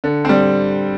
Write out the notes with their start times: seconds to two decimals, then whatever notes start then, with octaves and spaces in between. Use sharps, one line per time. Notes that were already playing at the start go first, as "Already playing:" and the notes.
0.04 D3
0.25 G3 C4